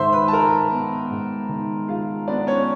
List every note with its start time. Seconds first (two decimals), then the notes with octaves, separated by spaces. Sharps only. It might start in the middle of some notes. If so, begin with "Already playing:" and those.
Already playing: G#2 D#3 C5 E5 C6 E6
0.13 B4 B5
0.28 A5
0.32 G#3 A#4 A#5
0.72 B3
1.10 G#2
1.49 D#3
1.88 G#3 F4 F5
2.28 B3 D4 D5
2.47 C#4 C#5